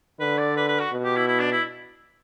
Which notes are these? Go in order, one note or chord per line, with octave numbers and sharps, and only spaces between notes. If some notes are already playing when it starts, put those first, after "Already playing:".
D3 B4
D5
B4
B4
F#4
B2
G4
E4
E4
D4
E4